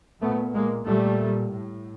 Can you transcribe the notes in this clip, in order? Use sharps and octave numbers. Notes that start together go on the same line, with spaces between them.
A#2 A3 B3
G#3 A#3
A#2 G3 A3
A2